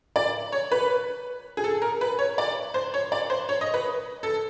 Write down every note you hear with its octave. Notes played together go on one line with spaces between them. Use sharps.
D5
C#5
B4
G#4
A4
A#4
B4
C#5
D5
C5
C#5
D5
C5
C#5
D#5
B4
A4